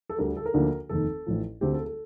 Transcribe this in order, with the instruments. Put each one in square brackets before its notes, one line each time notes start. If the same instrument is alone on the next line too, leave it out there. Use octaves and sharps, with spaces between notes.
[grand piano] A4
D2 D3 G3 A#4
A4
A#4
D2 D3 F3 A#3 D4
F1 D#2 D#3 A4
A1 A2 F3
D2 D3 A3 C4 G4
A4
A4